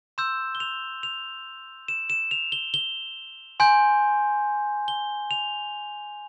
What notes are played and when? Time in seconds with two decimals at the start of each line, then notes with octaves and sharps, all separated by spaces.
0.18 C6 E6 G6 E7
0.55 G7
0.60 F7
1.03 F7
1.88 E7
2.10 E7
2.31 F7
2.52 G7
2.74 G7
3.60 G#5 C6 G6
4.88 G7
5.31 F7